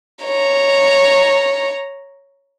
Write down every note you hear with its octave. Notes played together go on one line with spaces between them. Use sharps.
C#5 A#5